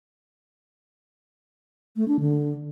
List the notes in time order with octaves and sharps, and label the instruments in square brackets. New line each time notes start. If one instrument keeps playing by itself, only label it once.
[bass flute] A3
D4
D3